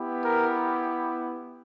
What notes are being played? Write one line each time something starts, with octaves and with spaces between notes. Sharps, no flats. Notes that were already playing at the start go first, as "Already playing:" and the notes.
Already playing: B3 E4 G4
A#4